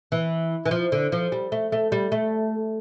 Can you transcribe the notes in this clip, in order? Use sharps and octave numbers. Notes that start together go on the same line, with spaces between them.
E3
E3
F3
D3
F3
G3
A3
A3
G3
A3